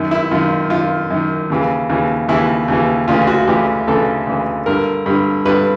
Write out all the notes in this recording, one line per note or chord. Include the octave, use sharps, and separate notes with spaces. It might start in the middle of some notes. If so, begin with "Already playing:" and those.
Already playing: F#2 D#3
E4
F#2 D#3 F4
F#2 D#3 F4
F#2 D#3
D#2 C#3 E3
D#2 C#3 E3
D#2 C#3 E3 E4
D#2 C#3 E3
D2 C#3 E3 F4
F#4
D2 C#3 E3 G4
D2 C#3 E3 A4
D2 C#3 E3
G2 D3 A#4
G2 D3
G2 D3 B4